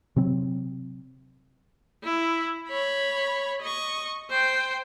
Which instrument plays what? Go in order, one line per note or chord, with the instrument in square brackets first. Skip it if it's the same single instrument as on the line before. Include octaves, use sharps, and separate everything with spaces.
[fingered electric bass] C3 F#3 C4
[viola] E4
C#5 B5
D#5 C#6
C5 G5